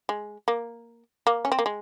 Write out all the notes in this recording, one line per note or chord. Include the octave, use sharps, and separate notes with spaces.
G#3
A#3
A#3
C#4
C4
A#3
G#3